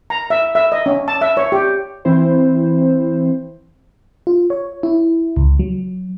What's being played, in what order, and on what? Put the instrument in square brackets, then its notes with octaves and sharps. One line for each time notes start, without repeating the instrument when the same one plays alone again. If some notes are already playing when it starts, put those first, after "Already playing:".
[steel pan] A#5
E5
E5
D#5
C#4
A5
E5
C#5
G4
[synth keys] E3 C4 E4 C5
[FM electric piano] F4
C#5
E4
C#2
F#3